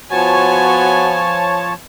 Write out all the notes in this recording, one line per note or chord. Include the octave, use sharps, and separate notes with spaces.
F3 B3 F#4 C#5 G#5 A5